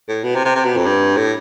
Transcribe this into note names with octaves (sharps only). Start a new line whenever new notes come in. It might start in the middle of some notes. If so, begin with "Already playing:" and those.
A2
B2
C3
C3
C3
B2
F2
G2
A2